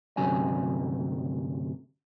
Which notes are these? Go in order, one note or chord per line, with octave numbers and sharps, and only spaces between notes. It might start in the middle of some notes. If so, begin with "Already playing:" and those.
D2 G2 C3 F#3 C#4 G#5